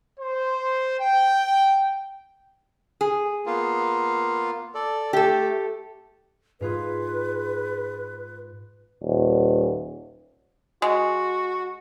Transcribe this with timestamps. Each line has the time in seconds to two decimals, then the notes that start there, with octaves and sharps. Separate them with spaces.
0.20 C5
1.00 G5
3.01 G#4
3.46 A#3 B3 F4
4.75 A4 D5
5.13 A3 G4 A4
6.61 G#2 F4 G#4 B4
9.02 D#1
10.82 G#3 F#4